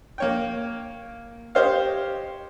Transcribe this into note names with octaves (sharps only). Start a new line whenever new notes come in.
A#3 C#5 G5
G4 C5 C#5 D#5 F5